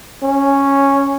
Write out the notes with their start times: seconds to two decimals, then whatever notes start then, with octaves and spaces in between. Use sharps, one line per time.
0.23 C#4